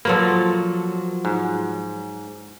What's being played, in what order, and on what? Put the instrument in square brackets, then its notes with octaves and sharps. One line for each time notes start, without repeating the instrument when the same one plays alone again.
[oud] F3 F#3 B4 [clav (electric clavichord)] A#3 A4
[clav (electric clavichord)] G#2